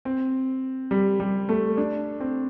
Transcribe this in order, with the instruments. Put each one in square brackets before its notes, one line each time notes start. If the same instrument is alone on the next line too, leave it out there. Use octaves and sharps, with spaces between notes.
[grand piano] C4
G3
G3
A3
D4
C4